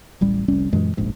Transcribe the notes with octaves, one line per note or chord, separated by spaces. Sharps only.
D1 A1 G3
F1 C2 G3 C#4
F#2 A#2 E3 G#3
F1 A#1 G#2